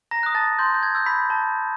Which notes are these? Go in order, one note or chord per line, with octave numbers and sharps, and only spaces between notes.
A#5 A#6
D#6 F#6
A5 A6
C6 G6
G6
G#6
E6 G6
B5 B6
A5